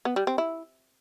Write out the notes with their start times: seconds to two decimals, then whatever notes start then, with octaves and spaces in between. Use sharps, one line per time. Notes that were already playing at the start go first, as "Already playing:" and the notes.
0.05 B3
0.16 G3
0.27 C4
0.38 E4